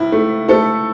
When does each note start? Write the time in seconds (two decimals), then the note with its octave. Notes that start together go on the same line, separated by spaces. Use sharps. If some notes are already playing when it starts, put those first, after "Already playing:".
Already playing: C#2 E4
0.12 A3
0.49 A3 A4